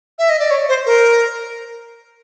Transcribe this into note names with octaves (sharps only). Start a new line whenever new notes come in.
E5
D#5
D5
C#5
C5
A#4